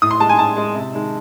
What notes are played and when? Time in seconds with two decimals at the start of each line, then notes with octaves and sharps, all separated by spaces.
0.02 A2 D#6
0.11 C6
0.20 G#3 A5
0.29 G#5
0.38 A2 A5
0.57 G#3
0.75 C3
0.93 D#3 G#3